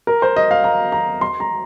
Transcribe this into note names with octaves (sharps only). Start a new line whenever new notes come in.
A#4
C5
D#5
F5
A#5
A#5
C6
A#5